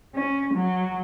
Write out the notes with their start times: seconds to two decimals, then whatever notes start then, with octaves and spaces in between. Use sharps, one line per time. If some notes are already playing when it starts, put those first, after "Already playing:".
0.16 C#4
0.55 F#3